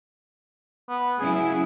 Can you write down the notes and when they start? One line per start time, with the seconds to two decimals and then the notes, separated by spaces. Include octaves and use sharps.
0.89 B3
1.19 C#3 F#3 E4 G#4